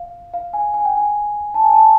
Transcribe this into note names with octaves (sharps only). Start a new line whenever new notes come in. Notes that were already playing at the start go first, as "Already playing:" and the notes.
Already playing: F5
F5
G#5
G#5
G5
G#5
A5
G#5
A5